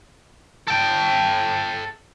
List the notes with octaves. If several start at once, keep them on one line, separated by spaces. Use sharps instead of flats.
A4 G5